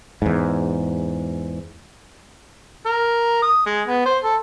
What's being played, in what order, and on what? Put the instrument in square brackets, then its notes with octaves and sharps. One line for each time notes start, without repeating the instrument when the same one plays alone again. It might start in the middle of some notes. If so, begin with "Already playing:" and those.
[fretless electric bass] E2 G#2
[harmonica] A#4
D#6
G#3
B3
C5
A4